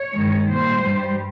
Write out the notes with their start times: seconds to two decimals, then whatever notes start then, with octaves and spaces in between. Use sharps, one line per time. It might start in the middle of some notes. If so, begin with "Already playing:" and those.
Already playing: C#5
0.13 G2 D#3 G#3
0.49 A#2 G3 C5
0.84 G2 G3